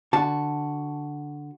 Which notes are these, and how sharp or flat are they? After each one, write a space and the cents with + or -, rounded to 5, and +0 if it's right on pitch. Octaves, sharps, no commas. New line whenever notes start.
D3 +0 F#4 +0 A5 +0